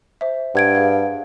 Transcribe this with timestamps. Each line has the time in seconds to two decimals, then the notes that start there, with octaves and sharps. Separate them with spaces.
0.21 C5 E5
0.55 G2 F#5 G#6 D7
0.75 G#4 F5 G#6